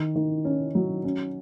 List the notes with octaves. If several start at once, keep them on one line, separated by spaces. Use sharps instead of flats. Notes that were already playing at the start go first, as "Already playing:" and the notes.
Already playing: D#3
D#3
C#4
F#3
C#4